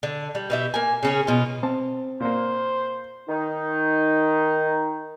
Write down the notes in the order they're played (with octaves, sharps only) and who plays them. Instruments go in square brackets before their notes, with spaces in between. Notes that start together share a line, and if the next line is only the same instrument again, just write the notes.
[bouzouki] D3
G3
B2 G4 E5
A#3 G#5
C#3 C#4 G#4
B2 F4
[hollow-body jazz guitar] C4 [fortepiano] A5
[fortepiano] A#2 A#3 [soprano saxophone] C5
[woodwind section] D#3 D#4